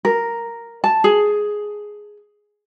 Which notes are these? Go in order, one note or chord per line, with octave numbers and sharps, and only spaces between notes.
A#4
A5
G#4